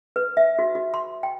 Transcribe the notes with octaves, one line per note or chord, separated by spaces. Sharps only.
B4
E5
F#4
F#4
C6
G5